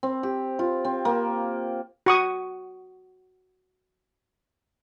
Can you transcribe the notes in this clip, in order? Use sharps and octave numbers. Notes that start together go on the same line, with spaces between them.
C4
G4
F4
C4
A#3
F#4 C#6 D#6